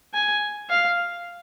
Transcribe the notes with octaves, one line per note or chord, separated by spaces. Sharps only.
G#5
F5